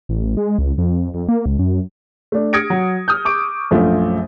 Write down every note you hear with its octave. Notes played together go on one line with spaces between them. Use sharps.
A1
G#3
C#2
F2
F2
A#3
C#2
F#2
A3 D4
D#6 F6 G#6 A#6 C#7 D7
F#3
D#6 F6 G6
C#6 D6 D7
A#1 F#2 F3 A3 F4